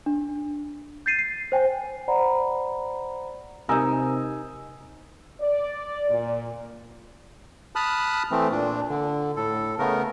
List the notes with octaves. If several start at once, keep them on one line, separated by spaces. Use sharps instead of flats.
D4
G6 A6 C7 D#7
C7
C5 G5 G#5
C5 D5 F#5 A#5 B5
C3 D#4 A#4 G#5 D#6 E6
D5
A#2
A5 B5 D#6 F6 F#6
E3 A3 C4
A#2 D4
D3
A2 A4
C#3 A3 B3 A#4